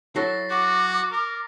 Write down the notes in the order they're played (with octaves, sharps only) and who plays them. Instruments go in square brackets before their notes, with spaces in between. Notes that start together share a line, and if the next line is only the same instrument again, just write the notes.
[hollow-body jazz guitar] F#3 E4 A4 [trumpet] E5 [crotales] A6 A#6 C7
[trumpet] F#4 [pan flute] D6
[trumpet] A#4